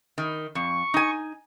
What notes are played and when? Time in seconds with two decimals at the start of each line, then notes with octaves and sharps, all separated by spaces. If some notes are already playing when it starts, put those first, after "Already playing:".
0.18 D#3
0.55 F2 C#6
0.94 D#4 G#5